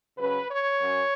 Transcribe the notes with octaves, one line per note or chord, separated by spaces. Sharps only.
C#3 F#3 C#4 B4
C#5
F#2 F#3 C#4